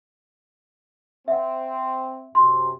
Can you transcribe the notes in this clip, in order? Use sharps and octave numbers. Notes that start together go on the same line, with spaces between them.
C4 E5 F#5
F#2 C3 C6